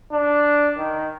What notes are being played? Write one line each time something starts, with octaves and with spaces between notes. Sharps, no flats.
D4
D#3